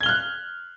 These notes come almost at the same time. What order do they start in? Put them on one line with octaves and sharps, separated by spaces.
G#6 G7 F6 F#6